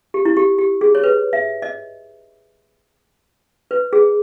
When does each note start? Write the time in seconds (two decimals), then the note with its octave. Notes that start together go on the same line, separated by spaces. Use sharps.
0.14 G4
0.25 E4
0.37 G4
0.58 G4
0.81 G#4
0.95 C#5
1.03 B4
1.33 E5
1.62 D#5
3.71 B4
3.93 G#4